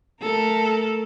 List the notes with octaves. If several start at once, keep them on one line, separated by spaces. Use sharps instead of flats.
A3 A4 A#4